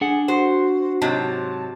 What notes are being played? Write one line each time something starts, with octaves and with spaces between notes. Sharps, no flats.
D4 G#4 F#5
F#4 C5
G#2 C3 F#3 A5